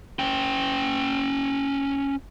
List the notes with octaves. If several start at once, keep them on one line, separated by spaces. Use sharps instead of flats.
C#4 G5